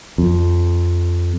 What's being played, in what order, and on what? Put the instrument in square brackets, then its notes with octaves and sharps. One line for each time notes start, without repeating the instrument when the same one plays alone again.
[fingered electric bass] F2